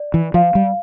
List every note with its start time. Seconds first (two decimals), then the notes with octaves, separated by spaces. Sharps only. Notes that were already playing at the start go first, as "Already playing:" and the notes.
Already playing: D5
0.14 E3
0.34 F3 F5
0.55 G3